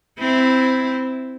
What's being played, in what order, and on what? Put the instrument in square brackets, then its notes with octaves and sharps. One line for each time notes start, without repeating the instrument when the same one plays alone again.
[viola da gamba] C4 E4